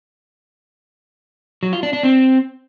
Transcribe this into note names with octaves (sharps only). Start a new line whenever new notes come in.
F#3
F4
D4
D4
C4